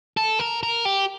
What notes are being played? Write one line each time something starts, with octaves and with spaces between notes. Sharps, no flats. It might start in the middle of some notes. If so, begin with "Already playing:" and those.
A4
A#4
A#4
G4